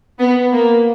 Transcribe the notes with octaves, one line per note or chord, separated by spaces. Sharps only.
B3
A#3